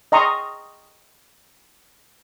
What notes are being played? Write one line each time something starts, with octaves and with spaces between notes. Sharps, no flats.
D#5 G5 A#5 C6 C#6 D#6